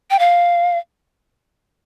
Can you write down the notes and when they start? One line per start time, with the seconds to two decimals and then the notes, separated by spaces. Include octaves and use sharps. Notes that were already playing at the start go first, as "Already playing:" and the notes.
0.11 G5
0.19 F5